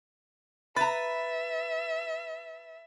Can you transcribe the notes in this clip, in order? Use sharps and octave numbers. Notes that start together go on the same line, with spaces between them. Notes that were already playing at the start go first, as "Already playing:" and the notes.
B4 E5 A#5 B5 A6